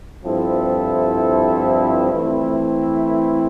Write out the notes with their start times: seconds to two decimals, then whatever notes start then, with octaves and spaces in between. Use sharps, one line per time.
0.23 G2 F3 C4 E4 A4
2.11 E3 A3 C4 E4